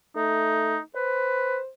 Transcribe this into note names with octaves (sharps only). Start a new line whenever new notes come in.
A3 D#4
B4 C5